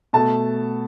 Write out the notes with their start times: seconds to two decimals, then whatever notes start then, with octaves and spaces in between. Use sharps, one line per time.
0.13 B2 A3 A5